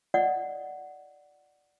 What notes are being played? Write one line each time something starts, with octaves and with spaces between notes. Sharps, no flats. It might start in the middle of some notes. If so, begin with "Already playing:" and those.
D5 D#5 F#5